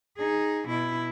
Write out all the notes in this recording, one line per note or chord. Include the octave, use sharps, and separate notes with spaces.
D#4 G#4
B2 E4